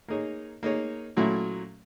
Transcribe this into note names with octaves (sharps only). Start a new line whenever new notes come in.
A#3 D#4 G#4 C#5
A#3 D#4 G#4 C#5
A#2 F#3 A3 C#4 E4